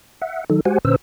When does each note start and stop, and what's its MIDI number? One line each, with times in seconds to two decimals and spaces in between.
0.22 0.44 76
0.22 0.44 78
0.50 0.61 51
0.50 0.61 54
0.50 0.61 63
0.50 0.61 69
0.65 0.79 56
0.65 0.79 66
0.65 0.79 67
0.65 0.79 72
0.65 0.79 78
0.65 0.79 80
0.85 0.96 46
0.85 0.96 50
0.85 0.96 61
0.85 0.96 71
0.85 0.96 72
0.85 0.96 88